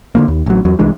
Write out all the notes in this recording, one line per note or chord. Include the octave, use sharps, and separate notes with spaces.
D3 E3 A#3
D#2
A1 F#3
E2 F#3
C2 E3 G#3 D4